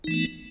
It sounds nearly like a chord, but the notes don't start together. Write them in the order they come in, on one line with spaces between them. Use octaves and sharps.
D#4 E3 A3 B3